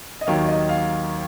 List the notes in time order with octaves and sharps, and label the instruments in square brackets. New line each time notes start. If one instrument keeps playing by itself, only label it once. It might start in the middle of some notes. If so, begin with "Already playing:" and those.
[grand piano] D#5
D#2 D#3 F#3 F5
D#5
F5